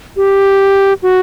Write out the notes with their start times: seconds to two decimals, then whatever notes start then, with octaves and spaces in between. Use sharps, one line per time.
0.16 G4
1.02 F#4